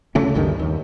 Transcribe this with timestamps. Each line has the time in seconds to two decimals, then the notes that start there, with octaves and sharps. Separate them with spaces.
0.15 D2 C#3 A3 C#4
0.34 G1 D2 G2 D#3
0.59 D#2